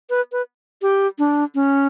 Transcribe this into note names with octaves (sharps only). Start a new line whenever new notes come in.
B4
B4
G4
D4
C#4